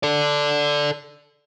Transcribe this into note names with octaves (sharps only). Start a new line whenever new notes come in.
A4 D5